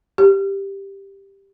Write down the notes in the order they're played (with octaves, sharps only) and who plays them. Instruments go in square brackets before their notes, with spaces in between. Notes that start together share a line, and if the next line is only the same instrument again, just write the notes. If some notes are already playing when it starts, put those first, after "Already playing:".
[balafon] G4